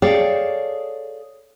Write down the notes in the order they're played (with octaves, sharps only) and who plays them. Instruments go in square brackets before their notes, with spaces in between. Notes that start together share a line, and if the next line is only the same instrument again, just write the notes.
[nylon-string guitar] G#4 A4 C#5 D5 F5 G5